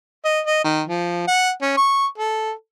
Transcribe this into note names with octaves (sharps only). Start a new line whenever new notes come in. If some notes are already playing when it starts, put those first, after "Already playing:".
D#5
D#5
D#3
F3
F#5
C#4
C#6
A4